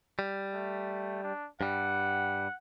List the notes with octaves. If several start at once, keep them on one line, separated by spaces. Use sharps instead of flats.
G3
A3
D4
G2 G3 F#5